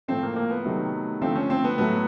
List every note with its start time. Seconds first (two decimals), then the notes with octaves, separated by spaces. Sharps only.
0.08 A2 F3 A3 C4
0.23 A#3
0.36 A#3
0.51 B3
0.65 C3 D#3 F#3 A3
1.21 D3 F3 A3 C4
1.36 C#4
1.50 C4
1.64 B3
1.78 A2 F#3 A3 B3